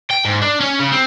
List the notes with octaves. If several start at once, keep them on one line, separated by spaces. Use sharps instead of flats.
G5
G#2
D4
C#4
C#3
C4